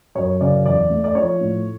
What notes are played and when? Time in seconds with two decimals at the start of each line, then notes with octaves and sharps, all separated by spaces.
0.15 F#2 C#5
0.41 C#3 D5
0.66 E2 D5
0.90 A3
1.04 D5
1.15 F3 C#5
1.41 A2